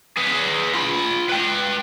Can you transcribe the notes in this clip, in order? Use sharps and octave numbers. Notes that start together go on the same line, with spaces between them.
G#4 B4
F4 B5
B4 G5